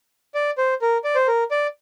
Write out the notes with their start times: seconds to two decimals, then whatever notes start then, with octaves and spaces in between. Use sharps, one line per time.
0.35 D5
0.58 C5
0.82 A#4
1.04 D5
1.15 C5
1.27 A#4
1.51 D5